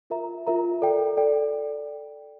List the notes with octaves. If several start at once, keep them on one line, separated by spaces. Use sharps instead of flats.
F4 A#4 E5 A#5
F4 A#4 E5 A#5
A4 D5 G5
A4 D5 G5